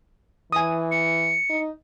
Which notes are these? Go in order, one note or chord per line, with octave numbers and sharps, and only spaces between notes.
E3 G#5 D#6
C#7
D#4